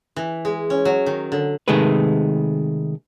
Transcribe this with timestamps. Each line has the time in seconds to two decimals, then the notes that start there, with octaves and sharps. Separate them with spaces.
0.16 E3
0.45 G#3
0.70 C#4
0.85 F#3
1.06 D#3
1.32 D3
1.68 C3 D#3 G#3 A3 G#4 B4